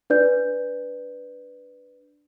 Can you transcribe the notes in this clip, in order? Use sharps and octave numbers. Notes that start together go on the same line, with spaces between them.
D4 B4 D5 G6